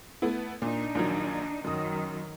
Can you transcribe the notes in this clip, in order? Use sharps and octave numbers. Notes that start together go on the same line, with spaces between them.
A3 B3 E4
A#2 D4 D#4
A#1 D#3 F#3
F#2 D#3 F#3 D#6